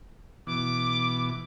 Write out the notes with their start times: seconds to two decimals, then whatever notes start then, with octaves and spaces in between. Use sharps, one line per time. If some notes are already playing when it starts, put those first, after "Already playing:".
0.47 B2 E3 D6